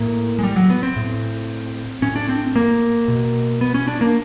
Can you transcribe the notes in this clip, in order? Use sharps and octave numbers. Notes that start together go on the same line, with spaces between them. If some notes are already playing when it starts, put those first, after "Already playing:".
Already playing: A2 A#3
G#3
G3
F#3
B3
C4
A2
A2 C#4
D4
C4
A#3
B2
B3
C#4
D4
A#3